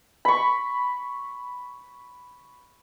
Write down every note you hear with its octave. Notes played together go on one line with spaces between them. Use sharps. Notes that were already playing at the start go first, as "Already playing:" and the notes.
B5 C#6